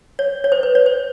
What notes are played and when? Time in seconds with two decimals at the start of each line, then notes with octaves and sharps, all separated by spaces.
0.19 C#5
0.44 C#5
0.52 C5
0.63 B4
0.75 C#5
0.86 C5